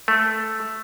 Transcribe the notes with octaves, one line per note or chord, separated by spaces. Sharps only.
A3